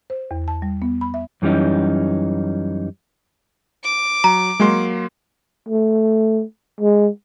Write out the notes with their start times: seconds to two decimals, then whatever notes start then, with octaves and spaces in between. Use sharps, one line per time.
0.10 C5
0.31 E2
0.48 A5
0.62 G3
0.82 B3
1.01 B5
1.14 E5
1.42 F#2 E3 G3 C#4 D#4
3.84 D6
4.24 F#3 A#5
4.60 F#3 G#3 A#3 C6
5.69 A3
6.80 G#3